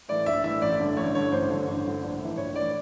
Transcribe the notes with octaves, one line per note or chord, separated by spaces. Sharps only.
A2 E3 D5
A#1 E5
A2 E3 E5
A1 D5
G2 D3
A1 C#5
G2 D3 C#5
A1 C5
G2 D3
A1
G2 D3
A#1
A2 E3
A#1 C#5
A2 E3 D5